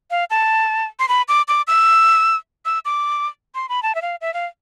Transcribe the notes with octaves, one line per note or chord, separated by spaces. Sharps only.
F5
A5
C6
B5
D6
D6
E6
E6
D6
C6
B5
A5
E5
F5
E5
F5